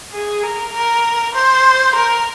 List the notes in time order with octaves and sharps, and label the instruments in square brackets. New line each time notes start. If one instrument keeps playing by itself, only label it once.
[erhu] G#4
A#4
A#4
C5
A#4